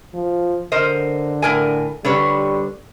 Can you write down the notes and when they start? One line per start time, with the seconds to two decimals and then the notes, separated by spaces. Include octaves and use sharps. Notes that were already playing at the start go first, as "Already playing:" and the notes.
0.14 F3
0.72 D3 A#4 C5 D#5
1.42 A2 A#4 G#5
2.05 D3 G3 B4 C#5